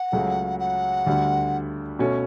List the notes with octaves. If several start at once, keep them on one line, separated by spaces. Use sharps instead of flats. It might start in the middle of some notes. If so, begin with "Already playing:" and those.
Already playing: F#5
C#2 C#3 F#3 A3
F#5
D2 D3 G3
B2 A3 C#4